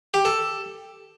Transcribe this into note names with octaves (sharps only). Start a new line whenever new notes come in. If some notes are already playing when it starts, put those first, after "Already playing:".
G4
A4